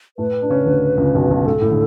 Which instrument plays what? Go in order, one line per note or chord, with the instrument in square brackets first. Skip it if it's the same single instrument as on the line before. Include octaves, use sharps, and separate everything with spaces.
[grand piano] A2 A3 [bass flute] B4
[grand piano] D4
C#3 C#4
D2 D3
C#2 C#3
B1 B2
B1 B2
[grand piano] G#2 [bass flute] A4
[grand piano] A2
D3